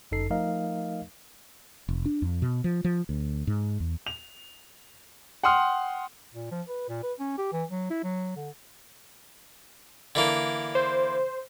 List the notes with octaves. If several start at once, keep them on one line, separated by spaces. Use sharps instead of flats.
G1 F#2 D#4 A4 C7
F3 A3 D#4 A#4 D#5 F5
F1
D4
F2
B2
F3
F3
D2
G#2
E2
F7
F#5 G5 C6 D#6 F6
A#2
F3
B4
A#2
B4
C#4
G4
E3
F#3
E4
F#3
D3
D3 E3 A#3
C5